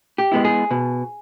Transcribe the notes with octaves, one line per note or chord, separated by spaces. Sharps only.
G4
G#3 B3 E4
G#4
B2